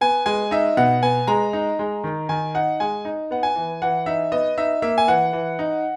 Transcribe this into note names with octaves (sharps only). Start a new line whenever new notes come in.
B3 G#5
G#3 G#5
D#4 E5
B2 F#5
B3 G#5
G#3 A#5
D#4
G#3
D#3
D#3 G#5
D#4 F#5
G#3 G#5
D#4
B3 F#5
G#5
E3
E3 F#5
D#4 E5
B3 D#5
D#4 E5
A#3 E5
G#5
E3 F#5
E3
D#4